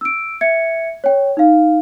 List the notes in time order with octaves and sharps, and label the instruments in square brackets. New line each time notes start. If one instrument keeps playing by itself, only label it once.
[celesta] E6 D7
E5 G#6 C#7
C#5 G5
D#4 F5